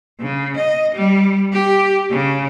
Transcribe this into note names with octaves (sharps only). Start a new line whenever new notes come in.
C#3
D#5
G3
G4
C#3